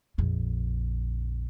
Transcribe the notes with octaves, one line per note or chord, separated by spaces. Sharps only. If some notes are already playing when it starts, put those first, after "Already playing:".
A#1 F2